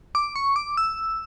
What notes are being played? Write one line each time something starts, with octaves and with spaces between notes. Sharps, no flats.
D6
C#6
D6
E6